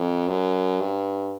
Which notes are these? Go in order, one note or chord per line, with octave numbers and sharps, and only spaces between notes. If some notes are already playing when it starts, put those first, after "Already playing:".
Already playing: F2
F#2
G2